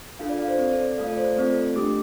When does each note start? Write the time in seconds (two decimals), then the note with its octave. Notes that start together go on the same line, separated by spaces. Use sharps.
0.19 D4 F4 A4 F5
0.29 D5
0.38 F5
0.48 C5
0.58 C4 D5
0.61 A4
0.72 D5
0.85 D5
0.98 A3 F4 A4 F5
1.07 D5
1.17 C5
1.26 D5
1.36 A3 C4 F4 A4
1.76 A3 D4 G4 D6